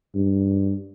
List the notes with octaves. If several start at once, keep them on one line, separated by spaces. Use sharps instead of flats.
G2